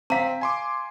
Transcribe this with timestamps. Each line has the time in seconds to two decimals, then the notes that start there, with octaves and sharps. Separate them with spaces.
0.10 C4 F5 A#5 B6
0.41 G#5 C6 D6